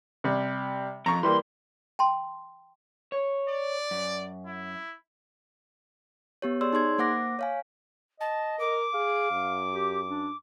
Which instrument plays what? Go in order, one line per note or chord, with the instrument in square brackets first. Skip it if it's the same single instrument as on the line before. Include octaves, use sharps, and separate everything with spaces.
[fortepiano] C3 G3
[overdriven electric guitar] F2 [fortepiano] A#5 C#6
[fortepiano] E3 G3 A#3 [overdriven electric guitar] C6
[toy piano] G5 A5 C6
[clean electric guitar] C#5
[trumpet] D5
[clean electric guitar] F#2
[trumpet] E4
[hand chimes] B3 G4 C#5
G#4 C#5 D5 C6 E6
D#4 G#4 C6 G#6
A#3 C5 F#5 D6 A#6
C#5 F5 G#5
[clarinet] D#5 [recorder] A5
[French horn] A#4 [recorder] D6
[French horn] G#4 [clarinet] F5
[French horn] F#2
[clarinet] G4
D4